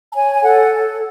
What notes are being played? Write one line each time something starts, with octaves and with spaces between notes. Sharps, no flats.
A5
C#5 G#5
G#5
A4 F#5